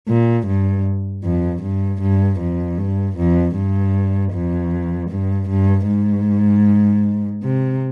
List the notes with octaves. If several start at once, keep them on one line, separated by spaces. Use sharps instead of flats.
A#2
G2
F2
G2
G2
F2
G2
F2
G2
F2
G2
G2
G#2
C3